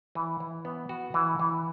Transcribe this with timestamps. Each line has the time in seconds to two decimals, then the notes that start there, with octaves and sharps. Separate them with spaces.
0.15 E3
0.40 E3
0.65 B3
0.89 F#4
1.14 E3
1.40 E3